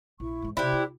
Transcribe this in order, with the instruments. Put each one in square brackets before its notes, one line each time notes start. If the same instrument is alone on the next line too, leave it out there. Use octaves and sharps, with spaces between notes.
[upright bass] A#1 [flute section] E4 C#6
[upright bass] G#2 E3
[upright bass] C3 B3 [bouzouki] E4 G4 [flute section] C5 D5 F#6
[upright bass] F4